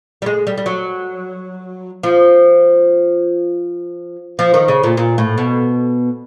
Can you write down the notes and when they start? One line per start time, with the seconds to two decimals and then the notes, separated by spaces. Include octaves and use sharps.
0.22 G3
0.26 G#3
0.47 G3
0.57 G3
0.66 F#3
2.03 F3
4.39 F3
4.54 D#3
4.68 C#3
4.83 A#2
4.97 A#2
5.18 A2
5.38 B2